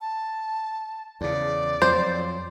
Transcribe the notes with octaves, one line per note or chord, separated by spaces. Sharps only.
A5
E2 C#3 D5
F2 F#3 C5